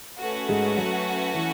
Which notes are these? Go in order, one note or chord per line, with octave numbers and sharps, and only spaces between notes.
A3 C#4 F#4 B4 F#5
G#2 G#3
F#3
E3